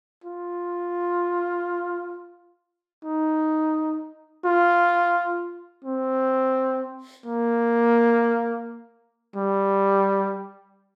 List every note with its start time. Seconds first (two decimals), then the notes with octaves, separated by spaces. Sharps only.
0.24 F4
3.05 D#4
4.45 F4
5.84 C4
7.26 A#3
9.36 G3